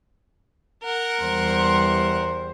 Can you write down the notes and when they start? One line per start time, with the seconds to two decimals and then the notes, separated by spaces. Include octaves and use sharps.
0.83 A#4 F#5
1.21 E2 G3 C5